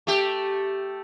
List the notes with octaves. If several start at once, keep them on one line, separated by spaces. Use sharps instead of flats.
A3 G4